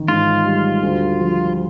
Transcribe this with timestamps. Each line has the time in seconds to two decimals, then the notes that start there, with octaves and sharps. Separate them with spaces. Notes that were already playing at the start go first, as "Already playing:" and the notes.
Already playing: A1 D#3
0.08 G#2 F4
0.45 G3
0.83 D2
1.19 F3